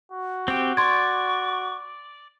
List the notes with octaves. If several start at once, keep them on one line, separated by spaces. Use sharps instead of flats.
F#4
C4 G4 G5
D5 C6 C#6 G#6